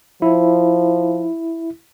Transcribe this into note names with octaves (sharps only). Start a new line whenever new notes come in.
F3 E4